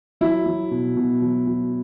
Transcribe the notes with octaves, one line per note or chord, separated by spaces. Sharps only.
F#3 E4
F#3
B2
B2
F#3
F#3